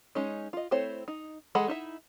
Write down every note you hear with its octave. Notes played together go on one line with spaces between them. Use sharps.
G#3 C#4 D#4
F4 D#5
A3 C4 E4 C5 C#5
D#4
E3 G#3 A4 F#5 B5
D#4 E4 E5